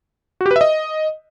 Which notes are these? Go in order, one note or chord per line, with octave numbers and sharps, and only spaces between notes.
F#4
G4
B4
E5
D#5